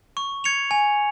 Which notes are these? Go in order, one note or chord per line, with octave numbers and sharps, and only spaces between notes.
C#6
G#6 C#7 F7
G#5